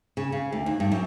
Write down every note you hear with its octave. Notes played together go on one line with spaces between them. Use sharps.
C#3
C#3
D2
D#2
G2
F#2